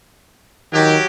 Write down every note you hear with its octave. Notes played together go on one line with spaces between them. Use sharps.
D#3 F#3 G4